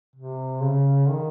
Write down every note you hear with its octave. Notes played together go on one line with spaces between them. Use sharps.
C3
C#3
D#3